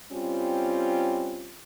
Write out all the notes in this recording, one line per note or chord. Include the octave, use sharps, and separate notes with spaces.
G3 C4 C#4 F4